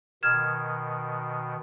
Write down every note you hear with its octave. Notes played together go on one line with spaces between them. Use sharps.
B2 D#3 F6 G#6 E7